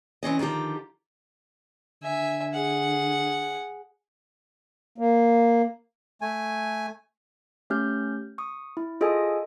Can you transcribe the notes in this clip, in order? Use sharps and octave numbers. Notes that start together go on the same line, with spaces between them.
E3 C4 C#4 D#5
D3 D#3 F3 G4 A#5
D3 E5 G#5
G#4 F#5
A#3
A3 G#5
A3 C#4 G4 F6 G6
C#6 D#6
E4
F4 G#4 A4 D#5 G#5 D#6